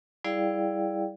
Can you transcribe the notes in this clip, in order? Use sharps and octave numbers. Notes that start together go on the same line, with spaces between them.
G3 E4 G#4 D5 F5 G5